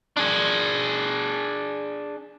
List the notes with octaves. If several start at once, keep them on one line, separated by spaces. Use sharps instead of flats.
D4 G#4